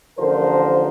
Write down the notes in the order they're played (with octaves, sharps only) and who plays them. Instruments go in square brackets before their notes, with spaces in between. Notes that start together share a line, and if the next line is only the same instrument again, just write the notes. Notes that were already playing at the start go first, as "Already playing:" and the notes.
[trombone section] A1 D3 F3 A#4 C5